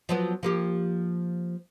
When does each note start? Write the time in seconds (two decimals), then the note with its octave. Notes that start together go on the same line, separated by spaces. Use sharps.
0.09 F3 F#3 B3
0.43 F3 A#3 G4